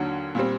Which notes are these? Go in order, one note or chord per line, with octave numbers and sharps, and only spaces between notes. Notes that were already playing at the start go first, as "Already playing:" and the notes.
Already playing: D#2 D3 F#3
A#2 G3 C4